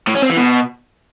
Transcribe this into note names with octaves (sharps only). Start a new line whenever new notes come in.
A2
C#4
C4
E3
B2